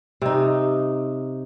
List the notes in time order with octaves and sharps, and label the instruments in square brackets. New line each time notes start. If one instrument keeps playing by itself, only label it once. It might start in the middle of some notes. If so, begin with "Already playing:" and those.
[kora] C3 D#4